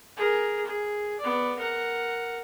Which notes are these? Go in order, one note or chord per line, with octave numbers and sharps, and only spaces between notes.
G#4 A#4
G#4
B3 D5
A#4 F#5